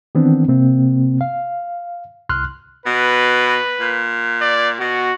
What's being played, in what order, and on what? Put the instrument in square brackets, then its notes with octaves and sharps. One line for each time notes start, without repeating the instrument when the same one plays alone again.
[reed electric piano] D#3 E3 B3 C4 D4
C3 A#3 C4
F5
C2 C6 F6 F#6
[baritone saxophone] B2 [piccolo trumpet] B4
[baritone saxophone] A#2
[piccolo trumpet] D5
[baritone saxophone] B2 [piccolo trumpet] F#4